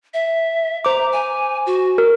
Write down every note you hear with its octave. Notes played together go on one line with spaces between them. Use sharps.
E5
C5 A#5 D6
G#5
F#4
A#4